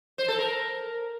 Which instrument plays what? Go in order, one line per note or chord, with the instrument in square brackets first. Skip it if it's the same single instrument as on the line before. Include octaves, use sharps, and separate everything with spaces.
[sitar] C5
A4
A#4